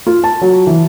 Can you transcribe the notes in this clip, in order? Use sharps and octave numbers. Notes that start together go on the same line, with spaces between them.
F4
A5
F#3
E3